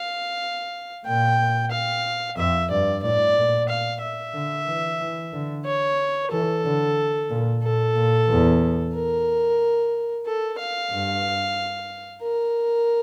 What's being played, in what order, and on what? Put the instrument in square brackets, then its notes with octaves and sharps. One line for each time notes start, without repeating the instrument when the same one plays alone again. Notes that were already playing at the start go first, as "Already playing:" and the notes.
Already playing: [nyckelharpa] F5
[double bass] A#2 [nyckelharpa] G5
[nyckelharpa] F5
[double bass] F2 [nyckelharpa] E5
[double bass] G2 [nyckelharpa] D5
[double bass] A2 [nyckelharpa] D5
[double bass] A#2
[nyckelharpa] F5
E5
[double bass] D3
E3
E3
D3
[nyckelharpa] C#5
[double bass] E3 [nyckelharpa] A4
[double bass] D3
A#2
[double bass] A#2 [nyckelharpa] A4
[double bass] A#2
E2
[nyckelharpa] A#4
A4
F5
[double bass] G2
[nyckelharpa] A#4